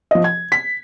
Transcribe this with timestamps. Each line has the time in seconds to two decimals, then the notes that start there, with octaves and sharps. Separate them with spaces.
0.11 F3 D#5
0.24 G#6
0.52 B6